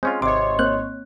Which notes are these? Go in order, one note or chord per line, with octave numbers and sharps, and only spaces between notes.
G#3 C4 C#4 F4
G#1 C3 C#5 D#5 C6 D6
A#3 C4 F#6